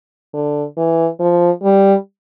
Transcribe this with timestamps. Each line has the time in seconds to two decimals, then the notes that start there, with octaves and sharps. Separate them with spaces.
0.33 D3
0.77 E3
1.20 F3
1.63 G3